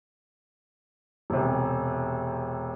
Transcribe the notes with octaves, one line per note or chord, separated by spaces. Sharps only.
E1 C3